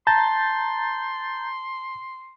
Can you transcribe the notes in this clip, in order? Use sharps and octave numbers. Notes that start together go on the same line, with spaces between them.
A5 A#5 C6 G6 A6